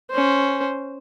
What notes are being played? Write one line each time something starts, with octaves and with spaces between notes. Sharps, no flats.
C#4 C5